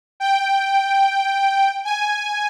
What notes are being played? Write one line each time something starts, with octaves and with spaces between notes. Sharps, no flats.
G5
G#5